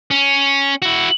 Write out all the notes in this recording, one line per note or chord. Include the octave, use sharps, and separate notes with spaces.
C#4
E4 F#4